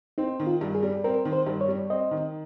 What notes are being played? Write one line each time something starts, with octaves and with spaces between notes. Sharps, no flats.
C4 D#4
D#3
F4
G2
G#4
G3
C4 A#4
D#3
C5
G2
C#5
G3
C4 D#5
D#3